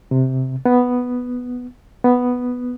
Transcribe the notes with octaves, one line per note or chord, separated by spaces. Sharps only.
C3
B3
B3